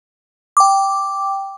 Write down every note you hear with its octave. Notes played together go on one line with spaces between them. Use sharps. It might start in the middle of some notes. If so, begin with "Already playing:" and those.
G5 D6